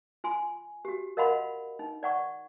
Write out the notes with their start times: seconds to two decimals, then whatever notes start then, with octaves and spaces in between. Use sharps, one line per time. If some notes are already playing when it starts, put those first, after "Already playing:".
0.24 F4 G#5 C6
0.85 F#4 G4
1.17 A#4 D#5 F5 F#5 B5 C6
1.79 D#4
2.03 D5 F#5 C#6